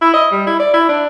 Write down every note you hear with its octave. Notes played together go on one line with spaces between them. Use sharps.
E4
D#5
G3
E4
D5
E4
D4